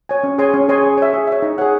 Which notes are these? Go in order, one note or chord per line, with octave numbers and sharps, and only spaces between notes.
C#5 G#5
C#4
G#4 C#5 G#5 C6
C#4
G#4 C#5 G#5 C6
G#4
C#5 E5
G#4
C#5 E5
D#4
G#4 C#5 F#5